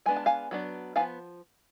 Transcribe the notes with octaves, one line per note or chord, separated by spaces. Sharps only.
G#3 B3 D4 G#5
A5
F5 G#5
F#3 B3 D4
F3 B3 D4 F5 G#5